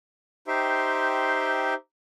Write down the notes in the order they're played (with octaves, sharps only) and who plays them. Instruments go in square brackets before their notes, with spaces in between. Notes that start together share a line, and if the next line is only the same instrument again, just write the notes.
[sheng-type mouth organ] D#4 G4 C5 E5 G5 C6